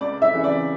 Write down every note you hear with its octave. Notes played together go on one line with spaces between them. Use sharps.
C#2 D5
E5
C#3 E3
D5